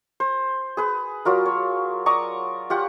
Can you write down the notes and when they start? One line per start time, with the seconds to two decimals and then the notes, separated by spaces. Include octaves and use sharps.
0.20 C5
0.77 G#4 B4
1.25 F#3 F4 A#4
1.46 C#5
2.06 D5 A#5 C#6 D#6
2.70 F4 G4 F#5